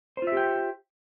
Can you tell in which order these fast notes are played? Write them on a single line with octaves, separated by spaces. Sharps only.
C5 F4 E5 G4 G5